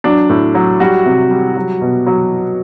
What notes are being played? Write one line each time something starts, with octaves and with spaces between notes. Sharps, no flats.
F#3 D4
A2
F#3
G3 F#4
C3
G3
F#3
B2
F#3